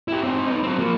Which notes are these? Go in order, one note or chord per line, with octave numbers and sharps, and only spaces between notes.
E4 G4
C4 D#4
B3 D#4
F#3 C4
F3 A#3